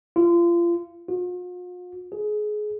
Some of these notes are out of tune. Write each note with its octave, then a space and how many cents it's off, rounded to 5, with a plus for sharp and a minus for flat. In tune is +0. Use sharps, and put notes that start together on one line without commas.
F4 -30
F4 +45
G#4 +25